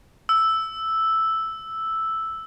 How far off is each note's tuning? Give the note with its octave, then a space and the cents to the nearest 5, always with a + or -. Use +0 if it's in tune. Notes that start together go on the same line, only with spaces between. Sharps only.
E6 -5